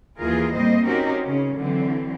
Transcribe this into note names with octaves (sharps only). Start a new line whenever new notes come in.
D#2 E3 F4 G#4 A#4
A2 G3 A#3 C4 C5 D#5
C4 C#4 D#4 F#4 G4 A#4
C#3 C#4
D3 E3 F#3 C4